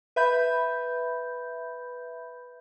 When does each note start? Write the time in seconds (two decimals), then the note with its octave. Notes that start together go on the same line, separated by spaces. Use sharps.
0.16 B4 E5 B5 G6